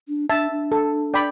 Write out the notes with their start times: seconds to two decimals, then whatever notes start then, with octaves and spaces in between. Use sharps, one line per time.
0.08 D4
0.30 D4 E5 A5
0.51 D4
0.72 A4
1.14 D5 G5 B5